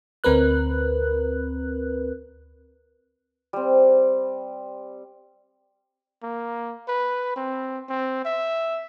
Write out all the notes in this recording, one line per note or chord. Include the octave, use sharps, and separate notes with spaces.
D2 C4 A#4 B4 F#6
G3 C4
A#3
B4
C4
C4
E5